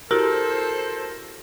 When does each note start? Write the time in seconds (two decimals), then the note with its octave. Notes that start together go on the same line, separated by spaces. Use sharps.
0.11 E4 F#4 G4 A4 A#4 C5